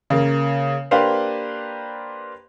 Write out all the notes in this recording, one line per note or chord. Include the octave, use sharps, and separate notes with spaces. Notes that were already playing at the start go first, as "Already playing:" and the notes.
C#3 A#3
A#3 D4 G4 B4 C5 F5